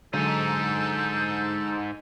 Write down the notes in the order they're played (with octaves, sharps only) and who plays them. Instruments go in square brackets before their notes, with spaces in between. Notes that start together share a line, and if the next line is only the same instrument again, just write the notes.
[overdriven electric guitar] G#2 D#4 [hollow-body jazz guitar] D3 F#3 G#3 [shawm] A4 [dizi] G6